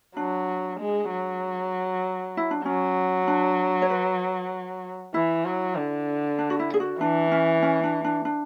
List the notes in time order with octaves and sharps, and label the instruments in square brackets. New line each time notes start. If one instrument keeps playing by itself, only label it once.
[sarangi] F#3 [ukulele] D4
[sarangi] G#3
F#3
[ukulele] E4
D4
[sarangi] F#3 [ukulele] C#4
[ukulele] D4
C#5
B4
[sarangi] E3 [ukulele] E4
[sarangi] F#3
D3
[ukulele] D4
F#4
E4
G#4
F#4
[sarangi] E3 [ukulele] D4
[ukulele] C#4
C#4
D4
D4
D4